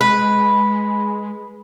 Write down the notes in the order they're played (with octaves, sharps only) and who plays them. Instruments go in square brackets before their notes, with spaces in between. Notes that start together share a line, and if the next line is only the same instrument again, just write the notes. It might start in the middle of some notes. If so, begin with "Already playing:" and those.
[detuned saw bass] G#3 [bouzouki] B4